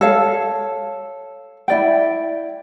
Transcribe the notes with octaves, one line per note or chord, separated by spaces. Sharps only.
A4 C#5 F5
E4 D5 G5